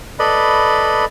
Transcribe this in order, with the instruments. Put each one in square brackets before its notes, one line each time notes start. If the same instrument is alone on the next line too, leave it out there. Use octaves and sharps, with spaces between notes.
[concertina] A4 B4 D5 D#5 B5